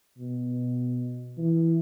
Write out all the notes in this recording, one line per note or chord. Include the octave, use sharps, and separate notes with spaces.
B2
E3